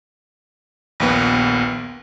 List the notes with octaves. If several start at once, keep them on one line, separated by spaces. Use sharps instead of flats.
A#1 D#2 B3